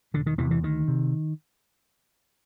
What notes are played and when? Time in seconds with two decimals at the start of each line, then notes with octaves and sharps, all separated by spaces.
0.14 E1 D3
0.26 D#3
0.38 E2 C3 E3
0.51 E3
0.63 D2 D#3
0.88 C3